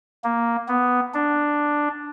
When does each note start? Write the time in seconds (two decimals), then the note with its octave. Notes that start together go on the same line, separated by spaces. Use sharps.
0.24 A#3
0.68 B3
1.14 D4